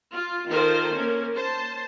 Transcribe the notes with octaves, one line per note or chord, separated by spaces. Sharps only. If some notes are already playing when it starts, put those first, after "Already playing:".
F4
D#3 F4 A4 A#4 C5
A#3 C#4 A#4
C5 A5